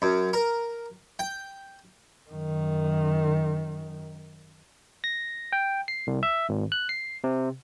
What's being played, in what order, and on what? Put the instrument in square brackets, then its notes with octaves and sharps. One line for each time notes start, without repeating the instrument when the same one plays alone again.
[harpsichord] F#2
A#4
G5
[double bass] F#2 D#3
[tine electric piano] A#6
G5
C7
C2
E5
G#1
F#6
C7
C3